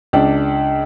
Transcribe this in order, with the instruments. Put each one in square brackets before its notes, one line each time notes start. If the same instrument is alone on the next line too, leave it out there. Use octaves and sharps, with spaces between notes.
[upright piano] C#2 D4